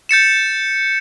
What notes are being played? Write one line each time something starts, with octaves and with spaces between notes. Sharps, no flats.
G6 A6 C#7 E7